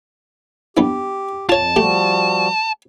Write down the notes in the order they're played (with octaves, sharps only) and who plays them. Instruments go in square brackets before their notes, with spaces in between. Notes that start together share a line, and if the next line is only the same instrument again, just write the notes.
[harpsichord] G2 B3 E4 [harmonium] G4
[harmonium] F2 [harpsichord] F4 C#5 [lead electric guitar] A5
[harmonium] F3 G3 F#4 [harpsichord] A3 G4